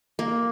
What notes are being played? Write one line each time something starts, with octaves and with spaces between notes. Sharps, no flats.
A#3